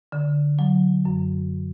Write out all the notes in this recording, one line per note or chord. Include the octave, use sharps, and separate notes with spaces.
D3
F#3
F#2